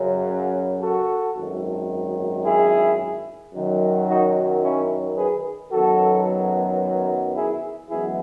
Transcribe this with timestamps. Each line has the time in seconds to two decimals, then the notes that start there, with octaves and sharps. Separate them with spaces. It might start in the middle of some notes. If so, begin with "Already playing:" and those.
Already playing: F#2 C#3 F#3
0.82 F#4 A4
1.36 G#1 F#2 D#3
2.45 E4 G#4
3.54 F#2 D#3 F#3
4.08 D#4 F#4
4.64 C#4 E4
5.17 G#4 B4
5.72 F#2 D#3 F#3 B3 F#4 A4
7.35 E4 G#4
7.90 F#2 E3 G#3 B3 E4 G#4